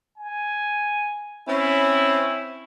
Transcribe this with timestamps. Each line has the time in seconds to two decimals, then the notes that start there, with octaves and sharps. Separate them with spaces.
0.17 G#5
1.48 C4 C#4 E4